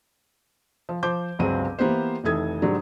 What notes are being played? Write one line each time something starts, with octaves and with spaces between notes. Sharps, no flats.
F3
F3 C5 D6 G6
G1 C#2 F#3 C4 G#4 D#7
E3 A#3 B3 G4 C5
F1 D#3 E3 A4 D#6 G#6
G#2 D3 F#3 G3